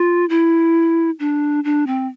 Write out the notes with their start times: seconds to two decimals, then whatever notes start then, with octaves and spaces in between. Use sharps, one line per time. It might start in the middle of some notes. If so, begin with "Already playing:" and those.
Already playing: F4
0.29 E4
1.20 D4
1.64 D4
1.87 C4